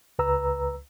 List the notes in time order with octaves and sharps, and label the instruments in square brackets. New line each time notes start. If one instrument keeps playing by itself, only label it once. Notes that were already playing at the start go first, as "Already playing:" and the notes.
[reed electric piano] C#2 B4 A#5 E6